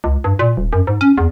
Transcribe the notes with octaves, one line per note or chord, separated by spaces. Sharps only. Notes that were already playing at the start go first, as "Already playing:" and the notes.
C#2
G2
A#2
D#1
F#2
G#2
C#4
E2